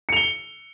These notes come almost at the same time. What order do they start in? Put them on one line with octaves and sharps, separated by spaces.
C#7 F7 G7